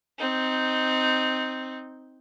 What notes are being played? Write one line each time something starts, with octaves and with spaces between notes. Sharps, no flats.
C4 D#4